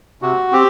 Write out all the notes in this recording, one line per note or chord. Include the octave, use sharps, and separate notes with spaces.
C3 F#4
C4 G4